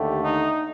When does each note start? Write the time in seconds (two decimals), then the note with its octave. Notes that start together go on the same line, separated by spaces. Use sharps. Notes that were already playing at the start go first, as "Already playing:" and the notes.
Already playing: D#2 D3 A3 G4
0.23 D#4